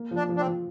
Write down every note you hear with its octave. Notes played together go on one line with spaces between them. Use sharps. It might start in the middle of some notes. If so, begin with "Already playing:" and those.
Already playing: A#3
F3
D4
F3
D4
C4
F3